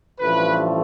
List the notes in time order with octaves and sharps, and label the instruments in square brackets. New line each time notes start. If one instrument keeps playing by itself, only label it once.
[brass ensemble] A1 G2 F3 A3 B4